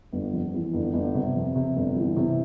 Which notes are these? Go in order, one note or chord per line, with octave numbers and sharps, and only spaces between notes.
G1
F2
E3
G1
G1
C3
F2
C3
G1
E3
C3